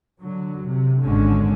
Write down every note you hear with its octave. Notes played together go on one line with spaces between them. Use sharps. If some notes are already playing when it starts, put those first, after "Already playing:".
D3 F#3
C3
G#1 F2 G#2 D3 G#3 C#4